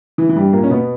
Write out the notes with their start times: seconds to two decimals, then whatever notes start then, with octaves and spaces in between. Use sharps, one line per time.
0.18 E3
0.29 E3
0.36 G2 G3
0.52 A#2 A#3
0.63 C#4
0.70 B2 B3